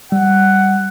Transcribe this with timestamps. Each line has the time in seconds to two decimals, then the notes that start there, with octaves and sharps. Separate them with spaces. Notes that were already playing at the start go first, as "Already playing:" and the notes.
0.12 G3 F#5